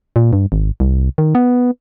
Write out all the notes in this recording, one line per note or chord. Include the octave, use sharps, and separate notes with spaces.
A#2
G2
G#1
C2
D#3
B3